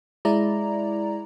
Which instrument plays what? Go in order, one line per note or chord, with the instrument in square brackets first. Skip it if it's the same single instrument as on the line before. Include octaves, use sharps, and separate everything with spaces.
[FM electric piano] G#3 E4 D5 A#5